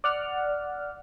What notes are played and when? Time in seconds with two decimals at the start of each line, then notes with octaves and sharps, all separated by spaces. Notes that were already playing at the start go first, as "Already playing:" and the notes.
0.04 D5 F#5 F6